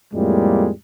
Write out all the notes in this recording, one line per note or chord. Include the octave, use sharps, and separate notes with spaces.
F2 A2 G3 G#3 A#3